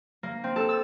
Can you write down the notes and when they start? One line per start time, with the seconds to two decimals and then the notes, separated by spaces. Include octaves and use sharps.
0.23 A#3
0.44 C4
0.56 A4
0.69 E6